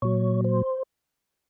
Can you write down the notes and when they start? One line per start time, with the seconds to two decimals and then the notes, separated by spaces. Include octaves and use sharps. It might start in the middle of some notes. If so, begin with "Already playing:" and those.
0.02 A#2 F#3 C#5
0.44 C5